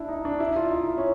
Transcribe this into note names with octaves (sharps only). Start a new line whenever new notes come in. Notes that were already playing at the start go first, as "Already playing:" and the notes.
Already playing: D4 E4
D#4
D4
E4
F4
D#4
E4
C#4